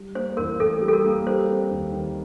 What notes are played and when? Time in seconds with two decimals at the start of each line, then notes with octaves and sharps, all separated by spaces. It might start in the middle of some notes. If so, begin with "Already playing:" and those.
Already playing: G3
0.15 A#3 C5
0.37 A1 A#4
0.60 A2 A4
0.81 G3
0.88 A4
0.93 A#4
1.04 A#3
1.27 G3 C5
1.49 C4
1.71 D#2
1.93 D#3